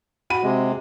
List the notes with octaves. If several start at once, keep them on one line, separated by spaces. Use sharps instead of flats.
F#4 B5 D#7
C3 G#3